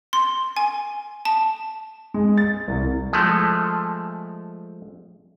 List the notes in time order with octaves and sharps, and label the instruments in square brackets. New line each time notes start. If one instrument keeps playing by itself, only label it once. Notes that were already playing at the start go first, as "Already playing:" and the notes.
[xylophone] C6
G#5
A5
[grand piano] G#3
A6
C2
[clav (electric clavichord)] F3 G#3 A3